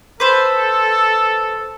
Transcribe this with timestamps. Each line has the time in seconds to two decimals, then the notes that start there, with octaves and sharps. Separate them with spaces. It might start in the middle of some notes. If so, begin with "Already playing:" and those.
0.20 A4 B4 C5